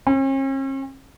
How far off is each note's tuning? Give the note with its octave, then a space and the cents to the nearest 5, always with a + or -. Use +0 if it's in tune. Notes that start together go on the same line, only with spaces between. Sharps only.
C#4 -45